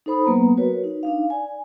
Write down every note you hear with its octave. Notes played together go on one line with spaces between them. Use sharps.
D#4 A4 C5 B5 D#6
F#3 A#3 B3 B4 A#5
F#4 A#4 B4 C#5
D#4
D4 D#4 F5
D5 G#5